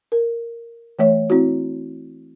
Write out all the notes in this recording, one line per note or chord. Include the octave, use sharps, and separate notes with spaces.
A#4
E3 A3 C#5 E5
C4 E4 F#4